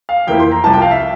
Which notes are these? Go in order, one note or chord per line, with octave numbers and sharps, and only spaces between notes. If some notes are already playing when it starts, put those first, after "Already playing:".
F5
F2 E3 A#3 E4 G5
C6
A#5
C2 C3 F3 A5
G5
F5
E5